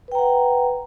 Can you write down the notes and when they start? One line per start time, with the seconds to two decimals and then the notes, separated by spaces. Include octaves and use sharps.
0.08 B4
0.12 G5
0.15 A#5
0.19 F#5